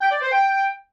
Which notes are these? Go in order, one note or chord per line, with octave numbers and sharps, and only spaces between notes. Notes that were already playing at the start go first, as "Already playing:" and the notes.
G5
D5
C5
G5